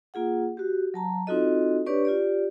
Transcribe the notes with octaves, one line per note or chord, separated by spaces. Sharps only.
A#3 F4 G#4 F#5
F#4 G4
F#3 A5 A#5
C4 D#4 F4 F#4 A4 D#5
D4 G4 B4 C#5 D5 C#6
F4 G4 D5